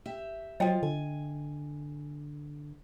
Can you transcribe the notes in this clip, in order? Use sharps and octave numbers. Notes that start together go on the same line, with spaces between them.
G4 E5
F3 F#3 F4 D#5 G5
D3 G#5